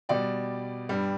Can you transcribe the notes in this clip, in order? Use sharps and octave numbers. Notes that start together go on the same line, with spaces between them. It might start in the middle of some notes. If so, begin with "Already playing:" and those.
B2 G3 D5 G5
G2 G3